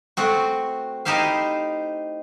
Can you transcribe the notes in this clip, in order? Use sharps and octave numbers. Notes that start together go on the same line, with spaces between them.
A3 C4 F#4
D#4 E4 G4 C5 F5